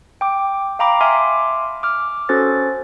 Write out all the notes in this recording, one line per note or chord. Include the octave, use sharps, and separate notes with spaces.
G5 D6
F5 G5 A#5 B5 D6
E5 G#5 C6 D6 F6
D6 F6
C#4 F#4 A4 C5 A6